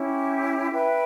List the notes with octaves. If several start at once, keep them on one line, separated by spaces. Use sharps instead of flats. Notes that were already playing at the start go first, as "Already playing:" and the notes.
Already playing: C#4 E4 G4
B4 E5 G5